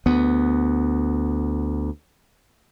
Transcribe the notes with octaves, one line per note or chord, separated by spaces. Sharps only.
D2 B3